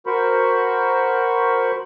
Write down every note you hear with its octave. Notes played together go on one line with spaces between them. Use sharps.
F#4 A#4 C5 B5 C#6